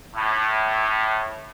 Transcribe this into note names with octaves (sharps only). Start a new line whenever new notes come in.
A2